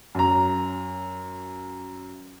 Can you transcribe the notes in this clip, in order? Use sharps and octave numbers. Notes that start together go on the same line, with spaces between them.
F#2 A#5